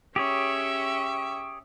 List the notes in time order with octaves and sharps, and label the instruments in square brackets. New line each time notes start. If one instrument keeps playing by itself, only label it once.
[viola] C#4 E5 [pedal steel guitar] G4 G#4 C#5